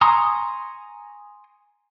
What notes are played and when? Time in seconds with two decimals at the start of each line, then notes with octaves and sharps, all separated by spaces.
0.01 G#5 A#5 C6 C#6 D#6